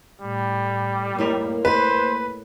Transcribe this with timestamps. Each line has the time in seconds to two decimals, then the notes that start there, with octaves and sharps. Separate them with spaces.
0.21 A2 G3
1.19 A2 A#3 D#4 E5
1.65 B4 C5